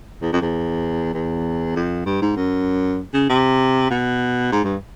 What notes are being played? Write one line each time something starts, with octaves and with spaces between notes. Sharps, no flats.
E2
F2
E2
E2
F2
G2
G#2
F#2
C#3
C3
B2
G#2
G2